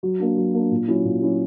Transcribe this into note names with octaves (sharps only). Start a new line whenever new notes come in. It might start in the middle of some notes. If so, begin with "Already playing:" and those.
F#3
A#3 D4
F#3
A#3 D4
A#2
F#3 C#4 E4
A#2
F#3 C#4 E4